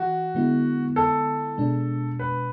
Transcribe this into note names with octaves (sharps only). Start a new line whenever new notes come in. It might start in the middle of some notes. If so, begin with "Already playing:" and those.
Already playing: E3 F#4
D3 G#3 B3 E4
A4
B2 G#3 D4
B4